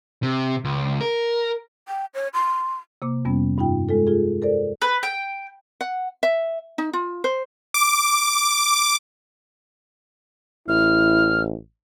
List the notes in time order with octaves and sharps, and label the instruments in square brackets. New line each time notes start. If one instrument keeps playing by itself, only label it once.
[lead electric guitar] C3
C#2
A#4
[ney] G5
C#5
C6
[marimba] C3 A#3 D6
F2 C3 G3 B3 C#4
G2 D#4 F4 G5
G#3 F4 A4
F4 G#4
A4 A#4 C5 D5
[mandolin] B4
G5
[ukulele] F#5
E5
D#4
F4
C5
[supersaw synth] D6
[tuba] A1 [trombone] E4 [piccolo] F6